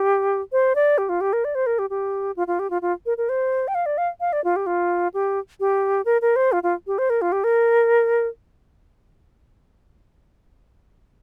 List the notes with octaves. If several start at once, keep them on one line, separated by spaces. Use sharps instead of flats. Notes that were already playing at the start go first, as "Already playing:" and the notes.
Already playing: G4
C5
D5
G4
F4
G4
A#4
D5
C5
A#4
G4
G4
F4
F4
G4
F4
F4
A#4
A#4
C5
G5
F5
D5
F5
F5
D5
F4
G4
F4
G4
G4
A#4
A#4
C5
F4
F4
G4
C5
A#4
F4
G4
A#4